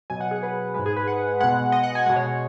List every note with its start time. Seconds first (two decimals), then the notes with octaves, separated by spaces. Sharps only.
0.10 B2 F#3 G#5
0.21 F#5
0.31 G#4
0.43 B4
0.74 G#2 G#3 B4
0.86 G#4
0.96 B4
1.07 F#5
1.40 B2 G#3 F#5
1.72 D#5
1.83 F#5
1.95 G#5
2.06 G#3 F#5
2.09 B2
2.16 C#5